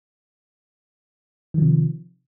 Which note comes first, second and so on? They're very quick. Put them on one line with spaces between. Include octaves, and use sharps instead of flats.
D#3 F3 C3